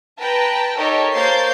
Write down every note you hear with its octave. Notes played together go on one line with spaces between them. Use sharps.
B4 G5 A5 A#5
D#4 G4 A4 A#4 C#5 D#5
A#3 C5 C#5 G6 A6 C7